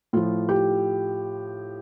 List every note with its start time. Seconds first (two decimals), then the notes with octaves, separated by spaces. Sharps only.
0.13 A2 F3 F4
0.49 G4